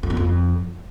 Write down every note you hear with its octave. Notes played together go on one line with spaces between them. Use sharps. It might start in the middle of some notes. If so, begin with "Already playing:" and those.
F2
E2
F2